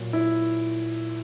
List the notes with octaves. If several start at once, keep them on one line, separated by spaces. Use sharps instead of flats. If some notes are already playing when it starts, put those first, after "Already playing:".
Already playing: A#2 F#3
E4